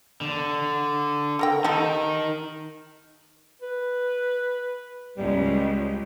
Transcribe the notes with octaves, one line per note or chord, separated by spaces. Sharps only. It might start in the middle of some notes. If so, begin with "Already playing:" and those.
D3
A4 A#4 G5
D#3 D#4 G4 A4
B4
C#2 G3